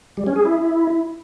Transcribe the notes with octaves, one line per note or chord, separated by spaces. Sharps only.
G3
C#4
G#4
E4